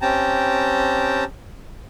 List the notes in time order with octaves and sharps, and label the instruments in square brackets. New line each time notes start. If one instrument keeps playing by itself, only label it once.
[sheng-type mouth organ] C4 C#4 G4 G5 A5 A#5